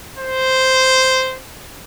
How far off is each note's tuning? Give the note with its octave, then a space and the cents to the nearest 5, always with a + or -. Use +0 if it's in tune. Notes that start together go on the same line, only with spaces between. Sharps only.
C5 -5